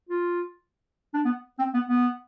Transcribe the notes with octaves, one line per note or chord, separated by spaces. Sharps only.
F4
D4
B3
C4
B3
B3